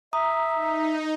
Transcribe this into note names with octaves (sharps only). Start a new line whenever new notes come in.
E5 A#5 D#6
D#4